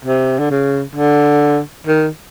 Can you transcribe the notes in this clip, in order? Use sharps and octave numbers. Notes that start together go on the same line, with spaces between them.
C3
D3
C#3
D3
D#3